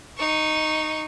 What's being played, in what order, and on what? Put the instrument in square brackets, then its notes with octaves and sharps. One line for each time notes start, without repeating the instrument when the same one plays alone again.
[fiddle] D#4 C#6